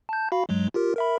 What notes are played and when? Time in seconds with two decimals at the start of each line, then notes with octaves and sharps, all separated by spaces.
0.09 A5 G6
0.32 F#4 F5 B5
0.49 G2 F#3 G#3
0.74 F4 G4 A#4
0.96 A#4 E5 B5